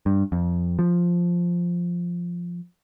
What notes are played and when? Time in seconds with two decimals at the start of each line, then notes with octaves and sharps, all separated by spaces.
0.06 G2
0.32 F2
0.79 F3